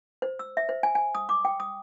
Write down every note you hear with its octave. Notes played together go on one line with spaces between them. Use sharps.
C5
E6
E5
C5
G#5
G#5
D#6
D6
G5
D#6